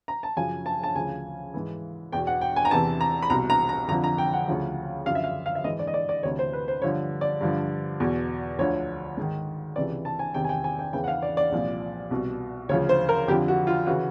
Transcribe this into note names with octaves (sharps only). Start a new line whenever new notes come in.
A#5
A5
F#2 C#3 F3 G#5
A5
A5
D2 C#3 F3 G#5
G#2 E3
E2 B2 G5
F#5
G5
G#5
A#5
E2 C3 E3 A5
A#5
B5
C2 B2 A#5
A#5
A#5
F2 D3 F3 A#5
A#5
G5
F#5
D2 C#3 F3
F#2 D3 F3 F5
E5
F5
F5
E5
G#2 E3 D#5
D5
D#5
D5
D5
D2 C3 E3 C#5
C5
B4
C5
G2 D3 F3 C#5
D5
G2 D3 F3
E2 B2
D2 D3 F3 C#5
G#2 D#3
C#2 C3 E3 D5
A5
G#5
E2 C3 D#3 G5
G#5
G5
G#5
G5
E2 C#3 E3 G5
F#5
F5
D5
D5
C2 A#2 F3
C2 B2
D2 C#3 F3 C#5
C5
A#4
F2 D3 F3 G4
F#4
F4
C#3 E3 F#4